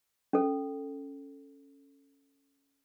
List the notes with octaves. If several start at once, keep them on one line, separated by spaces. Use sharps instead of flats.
C#4 A4